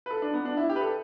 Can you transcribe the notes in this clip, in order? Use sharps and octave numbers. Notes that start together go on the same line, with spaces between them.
B4
A4
D4
B3
D4
E4
G4
B4
A4